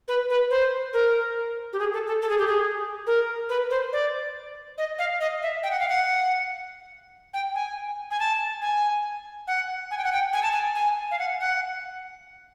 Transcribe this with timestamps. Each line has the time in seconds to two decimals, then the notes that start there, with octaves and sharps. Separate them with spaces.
0.08 B4
0.30 B4
0.50 C5
0.93 A#4
1.73 G4
1.79 G#4
1.93 A4
2.07 A4
2.22 A4
2.29 G#4
2.38 G4
2.47 G#4
3.07 A#4
3.49 B4
3.70 C5
3.93 D5
4.78 D#5
4.99 F5
5.21 D#5
5.42 E5
5.63 G5
5.71 F#5
5.80 F5
5.89 F#5
7.34 G5
7.55 G#5
8.11 G#5
8.20 A5
8.62 G#5
9.47 F#5
9.91 G#5
9.98 G5
10.04 F#5
10.12 G5
10.33 G#5
10.43 A5
10.52 G#5
10.75 G#5
11.11 F5
11.19 F#5
11.41 F#5